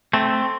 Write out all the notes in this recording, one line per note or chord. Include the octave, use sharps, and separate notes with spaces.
A3 C4